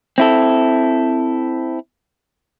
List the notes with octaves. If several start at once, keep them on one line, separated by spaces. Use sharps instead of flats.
C4 E4 A4